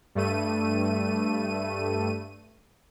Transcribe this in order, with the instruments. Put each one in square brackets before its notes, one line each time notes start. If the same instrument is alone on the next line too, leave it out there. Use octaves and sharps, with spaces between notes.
[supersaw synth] G2 A3 D#7